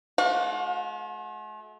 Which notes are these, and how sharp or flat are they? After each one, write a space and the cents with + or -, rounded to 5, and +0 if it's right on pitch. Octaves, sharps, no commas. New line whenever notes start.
A3 -45 F#4 -30 F5 +40